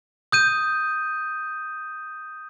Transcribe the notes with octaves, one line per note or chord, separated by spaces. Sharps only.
D#6 G6 D#7